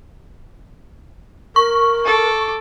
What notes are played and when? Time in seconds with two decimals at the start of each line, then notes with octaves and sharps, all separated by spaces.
1.56 A#4 C#6
2.05 A4 D6